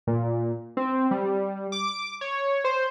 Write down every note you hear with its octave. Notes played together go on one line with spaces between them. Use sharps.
A#2
C4
G3
D6
C#5
C5